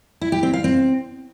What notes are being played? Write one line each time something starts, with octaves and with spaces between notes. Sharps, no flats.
E4
G4
C4
F5
C4